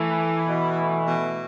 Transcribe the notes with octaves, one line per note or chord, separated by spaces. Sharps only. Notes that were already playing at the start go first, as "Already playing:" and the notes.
Already playing: E3 A3 A4
E4
B2
A3
B2